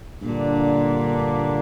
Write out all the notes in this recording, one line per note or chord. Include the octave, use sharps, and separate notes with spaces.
G2 A#2 D3 A#3 D4 F4